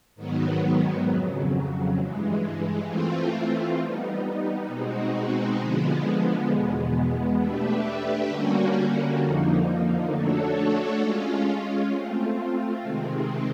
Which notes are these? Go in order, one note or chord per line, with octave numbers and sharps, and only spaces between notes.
G#2 D#3 F#3 B3
F2 C#3 F#3
G2 E3 G#3
E3 A3 C4 F4
G3 B3 D#4
B2 G#3 C4 D#4 F#4
D3 F3 G#3 B3
E2 B2 G#3 B3
A3 D4 G4 B4 E5
D3 G3 A#3 C#4 F#4
F2 D3 F3 A#3 D#4
A3 D4 F#4 A4 C#5
G#3 C#4 F4
A3 C4 F4
C3 D#3 G#3 C4